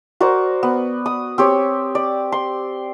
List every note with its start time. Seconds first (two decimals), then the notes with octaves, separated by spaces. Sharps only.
0.20 F#4 A#4 C5 D5
0.63 B3
1.06 D#6
1.38 C4 G4 C#5
1.95 D5
2.32 C6